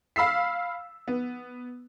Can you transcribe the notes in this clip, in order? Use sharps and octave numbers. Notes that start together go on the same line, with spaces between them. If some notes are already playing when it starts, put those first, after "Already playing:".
F5 B5 E6 B6 C7
B3